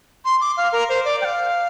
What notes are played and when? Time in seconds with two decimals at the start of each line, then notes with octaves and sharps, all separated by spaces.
0.25 C6
0.41 D6
0.57 F5
0.72 A#4
0.89 C5
1.05 D5
1.21 G5
1.25 F5